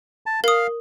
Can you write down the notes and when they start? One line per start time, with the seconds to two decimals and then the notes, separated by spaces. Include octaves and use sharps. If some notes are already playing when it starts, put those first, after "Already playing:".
0.26 A5
0.44 A#4 F5 D#6